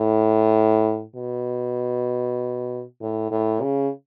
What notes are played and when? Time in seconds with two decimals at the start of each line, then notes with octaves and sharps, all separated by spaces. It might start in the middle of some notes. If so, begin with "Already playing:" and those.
Already playing: A2
1.16 B2
3.01 A2
3.31 A2
3.62 C#3